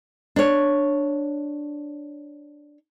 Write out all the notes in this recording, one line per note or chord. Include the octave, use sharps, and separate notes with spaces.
D4 C#5